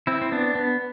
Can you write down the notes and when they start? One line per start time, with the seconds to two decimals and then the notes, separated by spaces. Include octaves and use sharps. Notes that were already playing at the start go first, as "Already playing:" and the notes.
0.07 C4 E4
0.22 C4
0.32 B3 D4
0.55 B3